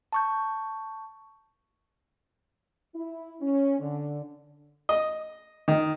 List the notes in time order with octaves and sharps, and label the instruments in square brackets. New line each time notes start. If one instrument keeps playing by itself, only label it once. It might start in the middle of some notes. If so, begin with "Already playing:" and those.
[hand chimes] A5 C#6 G6
[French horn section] E4
C#4
D3
[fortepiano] D#5
D#3